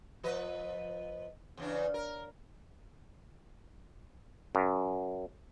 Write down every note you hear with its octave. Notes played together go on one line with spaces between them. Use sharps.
F3 B4 D#5
E2 C#3 D4
A#4
F#2